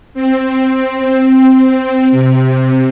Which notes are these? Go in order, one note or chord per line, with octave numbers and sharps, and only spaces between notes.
C4
C3